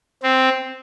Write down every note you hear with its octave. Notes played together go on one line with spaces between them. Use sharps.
C4